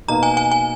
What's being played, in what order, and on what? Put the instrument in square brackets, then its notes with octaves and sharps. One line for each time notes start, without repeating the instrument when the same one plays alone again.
[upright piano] B2 A#3 D#4 [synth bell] A#5
[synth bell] G#5
G#5
G#5